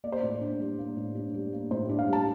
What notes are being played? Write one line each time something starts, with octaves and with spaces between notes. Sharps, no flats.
A#3 D5
C5
A2 D5
D4
G3
A#3
A2
D4
G3
A#3
A2 C5
D4
F5
G3
A5